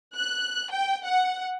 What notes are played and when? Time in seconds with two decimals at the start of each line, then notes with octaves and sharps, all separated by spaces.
0.14 F#6
0.70 G5
1.04 F#5